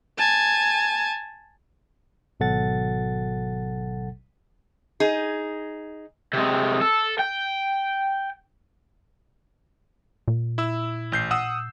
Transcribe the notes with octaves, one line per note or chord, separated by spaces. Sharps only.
G#5 A5
G#1 B2 F#3 A4 F#5 A6
D#4 G#4
C3 G#3
A4
G5
A#2
E4 E6
A1 G6 C7
F#5 D#6 E6